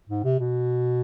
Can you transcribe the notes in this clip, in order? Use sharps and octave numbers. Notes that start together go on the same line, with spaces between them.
G#2
C3
B2